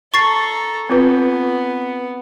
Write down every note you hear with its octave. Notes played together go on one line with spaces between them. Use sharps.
A4 A#5 C#6 A6 C7
B3 C4 F4 B4